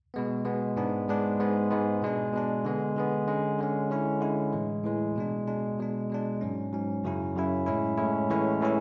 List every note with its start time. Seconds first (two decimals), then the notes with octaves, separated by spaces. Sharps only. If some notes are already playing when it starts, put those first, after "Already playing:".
0.14 B2 G#3 B3
0.45 B2 G#3 B3
0.76 G#2 G#3 B3 D4
1.08 G#2 G#3 B3 D4
1.39 G#2 G#3 B3
1.71 G#2 G#3 B3
2.02 B2 G#3 D4
2.33 B2 G#3 D4
2.65 D3 G#3 B3
2.96 D3 G#3 B3
3.27 D3 G#3 C#4
3.59 D3 G#3 C#4
3.90 D3 G#3 C#4 E4
4.21 D3 G#3 C#4 E4
4.53 A2 E3 G#3
4.84 A2 E3 G#3
5.16 B2 G#3 D4
5.47 B2 G#3 D4
5.78 B2 G#3 D4
6.09 B2 G#3 D4
6.41 G#2 F#3 C#4
6.72 G#2 F#3 C#4
7.04 F#2 C#3 F#3 C#4 E4
7.35 F#2 C#3 F#3 C#4 E4
7.66 A2 G#3 C#4 E4
7.98 A2 G#3 C#4 E4
8.30 A2 E3 G#3 C#4 E4
8.61 A2 E3 G#3 C#4 E4